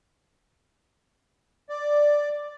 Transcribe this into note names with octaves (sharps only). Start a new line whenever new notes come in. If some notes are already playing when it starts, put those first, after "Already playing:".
D5